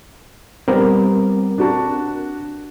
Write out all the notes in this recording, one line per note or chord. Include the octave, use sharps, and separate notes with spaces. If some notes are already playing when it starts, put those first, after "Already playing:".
G3 B3 C4 A#4
D4 F#4 A5